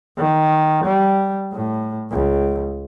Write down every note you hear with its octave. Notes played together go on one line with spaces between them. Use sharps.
D#3
G3
A2
C#2